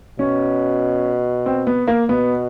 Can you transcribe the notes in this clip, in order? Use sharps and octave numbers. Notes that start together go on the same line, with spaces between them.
B2 C#4
C4
B3
A#3
B2 B3